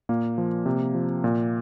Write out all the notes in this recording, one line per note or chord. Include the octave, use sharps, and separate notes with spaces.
A#2 A#3
F3
C3
F3
A#2